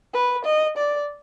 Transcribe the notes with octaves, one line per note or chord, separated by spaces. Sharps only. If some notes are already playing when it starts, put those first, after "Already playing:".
B4
D#5
D5